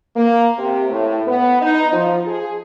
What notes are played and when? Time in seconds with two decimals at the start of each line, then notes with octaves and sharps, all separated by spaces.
0.16 A#3
0.58 C3
0.90 A2
1.27 B3
1.62 D#4
1.92 F3
2.27 G#4